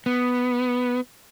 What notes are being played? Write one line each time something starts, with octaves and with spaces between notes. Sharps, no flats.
B3